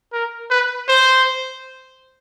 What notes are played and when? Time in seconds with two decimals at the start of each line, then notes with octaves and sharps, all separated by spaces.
0.13 A#4
0.51 B4
0.89 C5